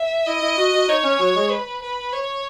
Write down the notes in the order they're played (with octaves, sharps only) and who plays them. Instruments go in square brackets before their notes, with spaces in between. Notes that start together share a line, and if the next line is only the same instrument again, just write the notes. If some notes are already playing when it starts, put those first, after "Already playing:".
Already playing: [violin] E5
[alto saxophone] E4 [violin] D#5
[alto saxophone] E4
F#4
F#4
[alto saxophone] D#4 [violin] C#5
[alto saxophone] C#4
F#3
G#3
[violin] B4
B4
C#5